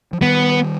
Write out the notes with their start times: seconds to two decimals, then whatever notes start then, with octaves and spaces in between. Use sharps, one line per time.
0.13 F3
0.22 D#3 G3 B3